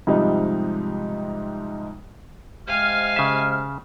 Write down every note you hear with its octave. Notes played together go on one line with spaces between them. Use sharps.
G#2 C3 F3 G3 D#4
C3 G#3 F5 G#5 F6
C#3 E5